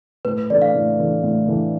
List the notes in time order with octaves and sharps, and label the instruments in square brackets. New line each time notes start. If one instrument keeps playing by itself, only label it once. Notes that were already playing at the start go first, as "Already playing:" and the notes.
[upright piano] A2 [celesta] B4
[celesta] B4
[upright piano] E3 A3 D4 [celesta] D5
[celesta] F5
[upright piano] A2
E3 A3 D4
A2
E3 A3 D4